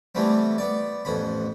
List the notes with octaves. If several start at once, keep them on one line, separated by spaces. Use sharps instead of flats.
E3 G3 A3 B3 C4
B3 D5
A1 F2 B3 B5